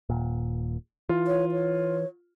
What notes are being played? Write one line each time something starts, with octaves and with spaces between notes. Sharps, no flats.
D#1 A#2
E3 F4
C#5
C#5